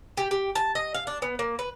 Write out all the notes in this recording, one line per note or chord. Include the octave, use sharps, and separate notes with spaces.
G4
G4
A5
D#5
F5
D4
B3
A#3
B4